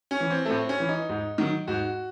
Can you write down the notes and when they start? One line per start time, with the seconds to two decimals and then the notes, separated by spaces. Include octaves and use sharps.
0.11 C#4
0.20 E3
0.30 C4
0.45 A3
0.50 A2 C4
0.69 C#4
0.80 E3
0.89 D#4
1.09 G#2
1.38 D#3 F#3
1.67 G#2 F#4